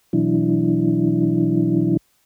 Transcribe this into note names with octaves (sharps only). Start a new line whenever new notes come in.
B2 E3 F#3 D4 E4